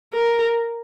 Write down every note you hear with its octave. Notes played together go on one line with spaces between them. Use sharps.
A#4